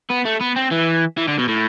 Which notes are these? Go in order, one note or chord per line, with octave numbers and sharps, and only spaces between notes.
B3
A3
B3
C4
E3
E3
D3
B2
A2